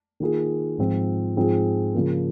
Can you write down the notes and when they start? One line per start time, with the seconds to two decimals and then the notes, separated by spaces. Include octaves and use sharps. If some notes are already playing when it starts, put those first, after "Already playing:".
0.20 D#3 A#3 F4 G#4
0.78 G#2 F3 C4 F4
1.37 G#2 F3 C4 F4 G#4
1.94 C#3 F3 A#3